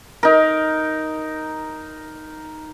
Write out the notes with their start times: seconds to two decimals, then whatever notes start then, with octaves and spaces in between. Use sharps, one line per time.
0.23 D#4 A#4